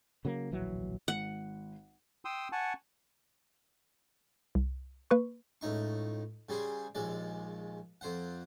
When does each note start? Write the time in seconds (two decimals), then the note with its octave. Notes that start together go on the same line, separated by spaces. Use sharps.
0.25 C#3 F#3 A#3
0.51 D1 A#1 E3 F#3
1.08 G#1 F#5
2.25 G5 C6 D#6 E6
2.52 F#5 G#5 A5 C#6
4.55 C2
5.11 A#3 B4 C#6
5.61 C#2 A2 D#4 C#6
6.49 C#3 G3 G#4 C5
6.95 A#1 D#2 G#3 D5
8.01 F2 C5 F#5